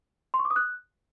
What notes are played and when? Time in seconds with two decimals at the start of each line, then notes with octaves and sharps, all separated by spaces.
0.34 C6
0.39 C#6
0.45 D6
0.51 D#6
0.56 F#6